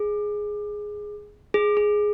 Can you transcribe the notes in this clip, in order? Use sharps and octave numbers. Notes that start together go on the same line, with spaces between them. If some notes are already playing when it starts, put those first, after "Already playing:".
Already playing: G#4
G#4
G#4